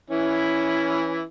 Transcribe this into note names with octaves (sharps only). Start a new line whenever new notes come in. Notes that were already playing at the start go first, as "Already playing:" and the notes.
E3 C#4 E4